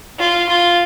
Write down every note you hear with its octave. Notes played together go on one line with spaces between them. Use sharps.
F4
F4